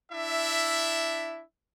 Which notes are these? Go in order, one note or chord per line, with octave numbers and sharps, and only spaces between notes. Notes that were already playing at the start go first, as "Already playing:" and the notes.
D4 E4 E5